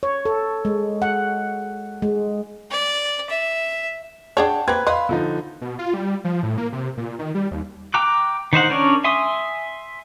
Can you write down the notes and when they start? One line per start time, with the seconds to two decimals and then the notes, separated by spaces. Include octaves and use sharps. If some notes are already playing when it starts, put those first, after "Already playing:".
0.03 C#5
0.25 A4
0.65 G#3
1.02 F#5
2.02 G#3
2.71 D5
3.30 E5
4.37 D4 G#4 C#5 F#5 G5 A5
4.68 A#3 C4 B4 G#6
4.87 B4 D#5 F5 B5 C6
5.09 D3 F3 D#4
5.61 B2
5.79 F4
5.94 G3
6.24 F3
6.43 A2
6.58 A#3
6.72 C3
6.97 A#2
7.19 D#3
7.35 G3
7.51 D#2
7.94 G5 A#5 D6 F#6
8.53 D#3 D#4 C5 F#5
8.70 C#4 D4 A#4 C#5 D5
9.04 E5 G#5 C6 D#6